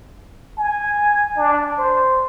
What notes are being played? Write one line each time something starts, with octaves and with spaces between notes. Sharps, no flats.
G#5
D4
C5